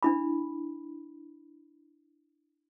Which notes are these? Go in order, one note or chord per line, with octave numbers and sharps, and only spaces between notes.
D4 E4 B5